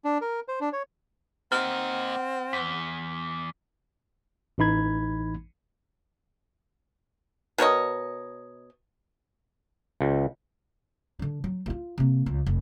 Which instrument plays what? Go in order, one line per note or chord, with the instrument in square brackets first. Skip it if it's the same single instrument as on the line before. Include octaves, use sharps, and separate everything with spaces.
[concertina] D4
A#4
C5
D4
C#5
[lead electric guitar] A#3 D#5 [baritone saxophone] C4 [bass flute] F#5 [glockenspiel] F6
[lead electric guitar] E2 [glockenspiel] B6
[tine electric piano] A1 E3 D#4 B5 G#6
[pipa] B2 A#4 C#5 D#5
[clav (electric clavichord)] C#2
[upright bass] D3 D4
F#3
G2 F4
C3 A#3
C#2
F1